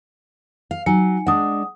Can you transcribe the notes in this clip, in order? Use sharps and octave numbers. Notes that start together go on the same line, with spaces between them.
F5
F#3 D#4 G#5 C#7
G#3 D4 F#5 D#6